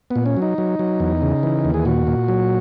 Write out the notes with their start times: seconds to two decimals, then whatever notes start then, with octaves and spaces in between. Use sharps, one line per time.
0.11 A#2 B3
0.26 C#4
0.37 F#3
0.42 D#4
0.58 F#3
0.79 F#3
1.00 E2
1.22 C#3
1.43 E3
1.65 D#2
1.74 G#4
1.85 A#2 F#4
2.07 A#2
2.28 F#3